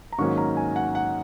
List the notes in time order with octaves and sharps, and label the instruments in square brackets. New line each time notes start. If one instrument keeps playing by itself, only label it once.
[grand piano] A#5
G#2 D#3 F#3 A#3 C#4 C#6
A#5
G#5
F#5
F#5